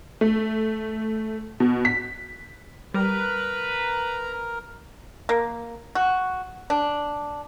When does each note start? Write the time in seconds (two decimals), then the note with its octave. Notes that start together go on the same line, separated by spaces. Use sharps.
0.21 A3
1.60 B2
1.85 B6
2.94 G3 A#4 B4 A#5
5.29 A#3
5.95 F#4
6.70 D4